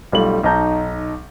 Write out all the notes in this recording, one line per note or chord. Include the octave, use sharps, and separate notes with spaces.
B1 G3 A3 F4 F#7
B1 D#4 A5 A#5 G6